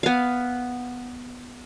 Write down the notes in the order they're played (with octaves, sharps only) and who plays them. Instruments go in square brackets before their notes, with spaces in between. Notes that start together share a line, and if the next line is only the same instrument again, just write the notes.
[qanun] B3 F5